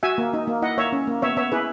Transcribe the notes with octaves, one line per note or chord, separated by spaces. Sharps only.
F#4 E5 G#5
A#3
D#4
A#3
E4 D#5 F#5
A#3 C#5 E5
C#4
A#3
B3 C#5 E5
B3 C#5 E5
E4 G#4 B4